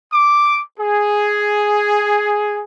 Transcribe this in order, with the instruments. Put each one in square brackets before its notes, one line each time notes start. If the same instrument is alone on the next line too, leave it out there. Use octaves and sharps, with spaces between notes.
[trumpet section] D6
G#4